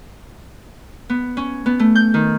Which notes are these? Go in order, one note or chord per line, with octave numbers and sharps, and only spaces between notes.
B3
C#4
B3
A3
G6
D#3